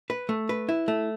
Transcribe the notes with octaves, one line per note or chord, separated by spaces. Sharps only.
B4
A3
B4
E4
A3